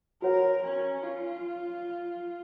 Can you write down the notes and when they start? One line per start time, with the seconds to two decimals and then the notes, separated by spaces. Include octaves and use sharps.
0.22 F#4 A#4 C#5 F#5
0.63 C#4
1.03 F4